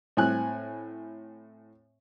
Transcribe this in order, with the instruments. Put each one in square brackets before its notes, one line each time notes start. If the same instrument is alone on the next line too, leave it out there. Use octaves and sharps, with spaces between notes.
[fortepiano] A2 C4 G#5 F#6